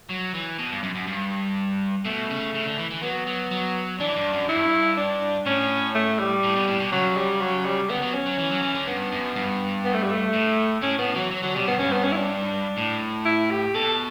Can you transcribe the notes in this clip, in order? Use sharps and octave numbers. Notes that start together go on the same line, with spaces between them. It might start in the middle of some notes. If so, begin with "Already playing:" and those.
F#3
E3
B2
G2
F#2
F#2
G2
B2 A3
C#3
C#3
D3
E3
E3
F#3 B3
F#3
F#3
E3 D4
G2
F#2
G2 E4
D4
A2 C#4
A3
G3
A2
B2
A2
B2
C#3 F#3
G3
F#3
G3
D3 B3
F#3
C#4
F#3
E3
F#3
E3
D3
G2 B3
F#2
G2
B3
A3
G3
A3
A2
A2 C#4
A2 B3
E3 F#3
F#3
D3 F#3
B2 G3
G2 B3
G2 C#4
B3
C#4
E4
D4
A2
E4
G4
B2 A4